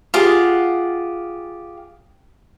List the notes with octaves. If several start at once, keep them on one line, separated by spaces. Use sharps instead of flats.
F4 G4 G#4 F#5